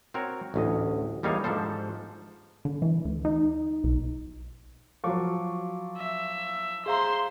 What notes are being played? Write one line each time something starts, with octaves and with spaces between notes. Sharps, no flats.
C4 F#4 A#4 C#5
A1 D2 D#5
E2 G3 A#3 D#4 C#5 F5
G#2 F3 D4 A4 C5
D3
E3
D2
D#4
B1
F3 F#3 F5 C#6 D6
E5
G#4 C5 F5 A#5 C6